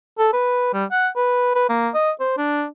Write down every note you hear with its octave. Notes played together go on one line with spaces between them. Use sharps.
A4
B4
G3
F#5
B4
B4
A#3
D#5
C5
D4